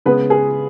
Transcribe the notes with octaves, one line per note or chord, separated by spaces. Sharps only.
C#3 G#3 B3 B4
G#4